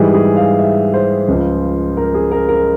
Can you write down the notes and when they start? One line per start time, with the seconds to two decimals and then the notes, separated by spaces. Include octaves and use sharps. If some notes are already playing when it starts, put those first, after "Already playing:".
Already playing: G#2 E3 G3 G#4
0.14 G#4
0.36 F5
0.59 E5
0.94 C5
1.28 C#2 C#3 F3
1.97 A#4
2.14 G#4
2.31 A#4
2.49 A#4